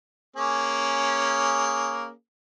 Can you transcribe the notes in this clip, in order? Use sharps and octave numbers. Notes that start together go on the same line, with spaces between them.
A#3 C#4 G#4